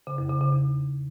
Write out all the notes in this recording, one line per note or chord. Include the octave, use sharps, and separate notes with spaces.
C#3
F2
C#3
C#3
E2